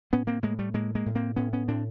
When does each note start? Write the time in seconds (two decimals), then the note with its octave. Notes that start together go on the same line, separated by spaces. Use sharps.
0.13 A2 B3 C#4
0.27 A#3 C4
0.43 A2 G#3 A#3
0.59 G3 A3
0.74 A2 G#3 A#3
0.95 G#3 A#3
1.06 A2
1.15 A#3 C4
1.36 A2 B3 C#4
1.53 B3 C#4
1.68 A2 C4 D4